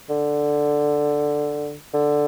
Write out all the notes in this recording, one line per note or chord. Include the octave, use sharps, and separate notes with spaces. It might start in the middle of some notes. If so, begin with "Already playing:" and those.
D3
D3